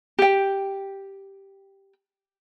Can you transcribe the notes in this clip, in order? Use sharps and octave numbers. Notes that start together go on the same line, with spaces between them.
G4 G5